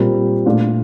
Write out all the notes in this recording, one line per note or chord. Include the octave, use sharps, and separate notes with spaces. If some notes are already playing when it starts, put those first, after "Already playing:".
Already playing: A#2 G3 C4 F4 A#4
A#2 A3 D4 F4